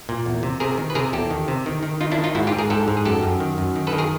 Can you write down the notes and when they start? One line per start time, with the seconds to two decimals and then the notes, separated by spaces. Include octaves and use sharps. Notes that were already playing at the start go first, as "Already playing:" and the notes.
0.09 A#2
0.26 E2
0.43 C3
0.60 C3 G#4 A#4
0.78 D#3
0.90 B4
0.95 C3 G#4 A#4
1.13 E2 G4 A4
1.31 D#3
1.48 C3
1.66 D#3
1.83 D#3
2.01 D#3 D#4 F4
2.12 D4 E4
2.18 D#3
2.24 D#4 F4
2.35 G#2 E4 F#4
2.47 F4 G4
2.52 G#2
2.59 G#4 A#4
2.70 G#2 G4 A4
2.88 G#2
2.97 G#4
3.05 F#2 G4 A4
3.23 F#2
3.40 D#3
3.58 F#2
3.76 D#3
3.87 A4 B4
3.93 D#3
3.98 G#4 A#4